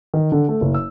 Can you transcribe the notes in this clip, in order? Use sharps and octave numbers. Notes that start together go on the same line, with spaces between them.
D#3
D3
A3
F#1
E6